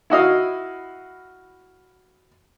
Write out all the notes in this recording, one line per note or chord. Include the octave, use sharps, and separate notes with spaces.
E4 F#4 D#5 F5